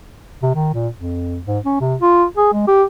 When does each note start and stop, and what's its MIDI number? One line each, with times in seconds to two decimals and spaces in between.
0.43 0.52 48
0.55 0.71 51
0.74 0.88 46
0.95 1.39 41
1.47 1.59 44
1.65 1.77 61
1.81 1.95 48
2.01 2.25 65
2.37 2.53 68
2.53 2.64 56
2.67 2.83 67